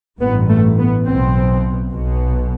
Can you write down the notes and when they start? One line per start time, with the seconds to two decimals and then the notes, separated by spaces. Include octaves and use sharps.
0.21 A1 G2 B3
0.50 A3
0.79 B3
1.07 B1 B2 C4
1.93 B1 B2